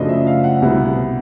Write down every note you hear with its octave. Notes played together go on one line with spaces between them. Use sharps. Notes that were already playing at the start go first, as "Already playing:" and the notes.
Already playing: F#2 C#3 F3 A3 D4 D#5
E5
F5
F#5
C2 B2 G3 B3 E4